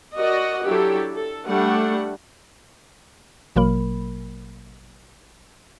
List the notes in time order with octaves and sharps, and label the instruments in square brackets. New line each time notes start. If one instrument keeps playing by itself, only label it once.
[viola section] F#4 A#4 D5 D#5 F#5
F#3 D4 E4 G4 A4
A4
G3 A3 D4 F#5
[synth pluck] A1 B2 F#3 A#3 A#4 B5